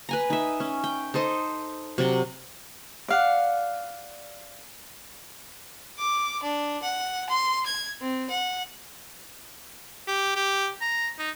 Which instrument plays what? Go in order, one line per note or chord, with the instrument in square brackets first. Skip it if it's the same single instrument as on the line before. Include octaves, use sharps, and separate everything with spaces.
[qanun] B4 G#5 A#5
D#4 E5
C#4
G5
D#4 A4 C5 D#5
C3 F#3 D5 G5
[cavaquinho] D5 F5 F#5
[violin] D6
D4
F#5
C6
G#6
C4
F#5
[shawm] G4
G4
A#5
D#4